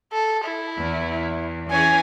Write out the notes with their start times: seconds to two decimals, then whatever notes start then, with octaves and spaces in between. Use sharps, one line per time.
0.13 A4
0.44 E4
0.76 E2
1.70 E3 C#4 G#4 G#5